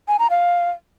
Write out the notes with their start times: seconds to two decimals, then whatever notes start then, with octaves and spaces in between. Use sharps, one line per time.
0.08 G#5
0.19 A#5
0.30 F5